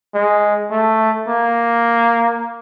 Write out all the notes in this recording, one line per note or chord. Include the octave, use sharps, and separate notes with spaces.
G#3
A3
A#3